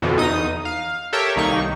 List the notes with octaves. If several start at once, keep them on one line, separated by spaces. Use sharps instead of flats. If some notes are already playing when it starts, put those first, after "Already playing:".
F2 B2 D3 E3 F3
E2 D#4 D#6
F5
G4 A4 A#4 C#5 E5 G5
C2 D#3 A#3 D#4 C#6